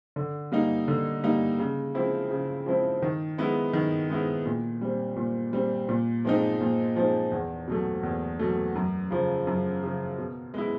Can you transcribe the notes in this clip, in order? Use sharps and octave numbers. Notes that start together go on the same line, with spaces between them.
D3
G3 A#3 D#4
D3
G3 A#3 D#4
C#3
F3 G#3 C4 E4
C#3
F3 G#3 C4 E4
D#3
G#3 B3 E4
D#3
G#3 B3 E4
A#2
G3 C4
A#2
G3 C4
A#2
F3 G#3 C4 D#4
A#2
F3 G#3 C4 D#4
E2
B2 F#3 A3
E2
B2 F#3 A3
F#2
C#3 F3
F#2
C#3 F3
B2
G#3 B3 E4